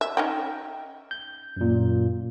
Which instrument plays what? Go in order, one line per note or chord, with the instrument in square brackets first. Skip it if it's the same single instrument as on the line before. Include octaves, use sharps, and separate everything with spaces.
[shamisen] E5
C#4 D#4 G5
[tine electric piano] G6
F#2 A#2